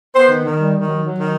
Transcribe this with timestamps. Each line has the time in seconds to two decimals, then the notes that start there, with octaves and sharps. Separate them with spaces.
0.15 B3 C5
0.30 D#3
0.44 D#3
0.58 G3
0.74 D#3
0.87 F#3
1.02 F#3
1.17 D#3